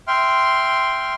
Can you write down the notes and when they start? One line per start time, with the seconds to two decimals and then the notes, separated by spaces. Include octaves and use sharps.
0.07 E5 G5 C6 F6